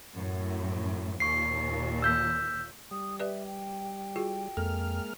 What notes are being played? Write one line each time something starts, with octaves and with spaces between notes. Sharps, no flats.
F#2 A2
D#2 A#2 C#6 C7
E6 G6 B6
G3 D#6
G4 B4 D5 E5
G5
F4 F#4 G#4
F2 G#3 A#3 A4 F6